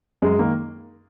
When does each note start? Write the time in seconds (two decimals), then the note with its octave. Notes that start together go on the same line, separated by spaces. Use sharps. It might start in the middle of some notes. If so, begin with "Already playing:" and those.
0.22 F#2 G#3
0.39 D#3 A#3